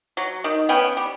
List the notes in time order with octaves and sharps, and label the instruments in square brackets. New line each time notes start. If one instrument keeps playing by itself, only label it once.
[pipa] F#3
D#3
B3 C#4 G5
G3